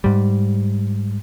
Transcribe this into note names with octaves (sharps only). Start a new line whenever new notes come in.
G#2 G3